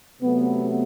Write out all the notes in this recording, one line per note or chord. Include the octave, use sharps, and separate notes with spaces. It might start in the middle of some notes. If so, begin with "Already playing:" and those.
C3 F#3 A3 B3